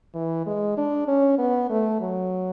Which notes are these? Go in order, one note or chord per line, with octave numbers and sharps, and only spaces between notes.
E3
G#3
D4
C#4
B3
A3
F#3